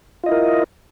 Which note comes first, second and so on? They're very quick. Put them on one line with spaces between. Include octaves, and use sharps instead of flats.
F4 D#5 E4 A#4